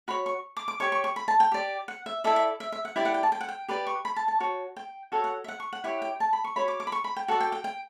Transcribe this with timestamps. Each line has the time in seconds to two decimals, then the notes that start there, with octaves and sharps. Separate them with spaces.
0.08 F#4 C#5 B5
0.26 C#6
0.57 D6
0.68 D6
0.80 G4 C#5 C#6
0.92 C#6
1.04 C#6
1.16 B5
1.28 A5
1.40 G5
1.52 G4 D5
1.88 F#5
2.06 E5
2.24 E4 A4 D5 E5
2.36 E5
2.60 E5
2.72 E5
2.85 F#5
2.96 E4 G4 D5 G5
3.05 F#5
3.14 G5
3.23 A5
3.32 G5
3.41 F#5
3.48 G5
3.68 G4 B4 D5
3.87 C#6
4.05 B5
4.16 A5
4.28 A5
4.40 F#4 C#5
4.76 G5
5.12 F#4 A4 C#5 F#5
5.24 F#5
5.44 E5
5.48 F#5
5.60 C#6
5.73 F#5
5.84 E4 G4 C#5 F#5
6.02 G5
6.20 A5
6.33 B5
6.44 C#6
6.56 F#4 C#5 B5
6.68 D6
6.80 D6
6.87 B5
6.92 C#6
7.04 B5
7.16 G5
7.28 F#4 A4 D5 F#5
7.40 G5
7.52 G5
7.64 G5